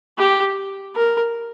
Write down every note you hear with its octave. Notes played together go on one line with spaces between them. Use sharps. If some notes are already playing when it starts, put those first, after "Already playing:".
G4
A#4